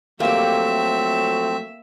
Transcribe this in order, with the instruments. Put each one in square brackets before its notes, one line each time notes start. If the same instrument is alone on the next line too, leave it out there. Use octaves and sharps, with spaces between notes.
[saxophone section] F3 F#3 A3 [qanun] A#3 G4 [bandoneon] C4 [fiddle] E5